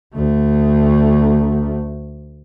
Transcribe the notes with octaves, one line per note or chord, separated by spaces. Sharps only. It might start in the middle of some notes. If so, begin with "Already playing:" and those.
D2 A3